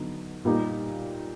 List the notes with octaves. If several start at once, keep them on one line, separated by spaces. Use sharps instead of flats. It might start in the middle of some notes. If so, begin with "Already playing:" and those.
Already playing: D3 F#3 B3 D#4
A#2 G3 A#3 D#4 G4